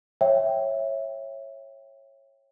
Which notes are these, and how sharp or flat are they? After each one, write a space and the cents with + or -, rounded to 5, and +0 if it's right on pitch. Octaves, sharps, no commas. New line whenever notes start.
C#5 -20 E5 +0 G5 +0